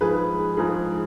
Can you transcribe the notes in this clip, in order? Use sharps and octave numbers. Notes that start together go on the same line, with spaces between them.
G#2 F3 G#3 G#4 B4
G#2 F3 G#3 G#4